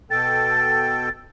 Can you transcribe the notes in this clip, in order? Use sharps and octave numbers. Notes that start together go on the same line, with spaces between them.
B2 A4 G5 A6